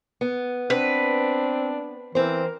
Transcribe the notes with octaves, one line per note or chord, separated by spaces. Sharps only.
B3
C4 D4 B4
E3 C4 A#4 C5